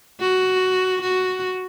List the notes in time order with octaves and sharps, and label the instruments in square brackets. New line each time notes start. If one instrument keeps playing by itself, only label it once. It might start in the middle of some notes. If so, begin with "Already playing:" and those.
[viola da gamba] F#4
F#4